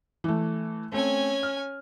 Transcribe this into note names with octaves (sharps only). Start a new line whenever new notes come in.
E3 A3
A3 C4 C#4 G#5
F6